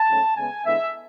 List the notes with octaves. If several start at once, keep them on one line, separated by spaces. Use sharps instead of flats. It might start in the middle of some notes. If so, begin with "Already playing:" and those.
Already playing: A5
G#2 F#3 A3 C#4
C#3 G#3 B3 G#5
D3 G#3 B3 E4 E5